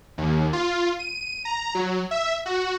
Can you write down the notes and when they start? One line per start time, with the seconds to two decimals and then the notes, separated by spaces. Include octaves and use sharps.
0.18 D#2
0.53 F4
0.99 D#7
1.45 A#5
1.75 F#3
2.11 E5
2.46 F#4